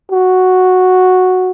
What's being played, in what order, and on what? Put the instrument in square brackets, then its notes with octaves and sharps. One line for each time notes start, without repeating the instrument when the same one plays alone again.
[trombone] F#4